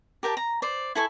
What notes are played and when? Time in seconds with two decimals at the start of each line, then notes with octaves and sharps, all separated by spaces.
0.23 G4 A#4 G5 A5
0.37 A#5
0.62 C5 D5
0.95 E4 A4 G#5 C#6